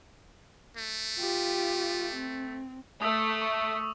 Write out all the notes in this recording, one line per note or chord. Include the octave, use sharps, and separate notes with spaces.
A3
F4 G4
C4
A3 D#6 E6
C#6